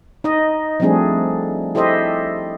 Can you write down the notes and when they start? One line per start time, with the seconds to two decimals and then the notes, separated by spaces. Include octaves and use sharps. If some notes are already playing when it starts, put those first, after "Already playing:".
0.24 D#4 D#5
0.80 F3 G3 A3 C4 D4 G#4
1.75 E4 G4 A4 C5 D#5 E5